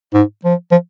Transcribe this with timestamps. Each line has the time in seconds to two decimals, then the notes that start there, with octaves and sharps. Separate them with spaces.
0.13 G#2
0.44 F3
0.71 F3